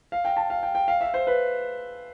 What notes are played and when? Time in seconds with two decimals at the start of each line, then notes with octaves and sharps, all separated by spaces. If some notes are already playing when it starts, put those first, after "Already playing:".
0.12 F5
0.25 G5
0.37 A5
0.50 F5
0.63 G5
0.75 G5
0.88 F5
1.01 E5
1.14 C5
1.27 B4